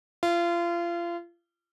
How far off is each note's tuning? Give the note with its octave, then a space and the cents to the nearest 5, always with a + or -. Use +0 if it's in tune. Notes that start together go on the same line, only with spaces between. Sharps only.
F4 -30